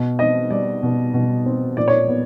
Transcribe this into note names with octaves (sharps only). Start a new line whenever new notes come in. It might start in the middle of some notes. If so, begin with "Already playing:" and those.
Already playing: B2
C4 D#5
G3 D5
B2
B2
C4
A#2 D5
C#5
B3